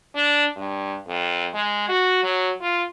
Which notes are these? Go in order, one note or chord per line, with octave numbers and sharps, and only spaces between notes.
D4
G2
F2
G#3
F#4
F#3
F4